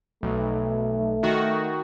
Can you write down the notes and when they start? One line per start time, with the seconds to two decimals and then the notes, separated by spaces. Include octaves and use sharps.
0.23 B1 A3
1.23 D#3 F#4